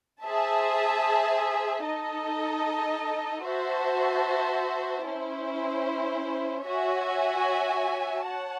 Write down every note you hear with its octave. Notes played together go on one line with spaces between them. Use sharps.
G#4 C5 E5 A5
D#4 A4 D#5
F#4 C5 E5 A5
C#4 E4 C5
F#4 C#5 E5 G#5
C#5 F#5 A5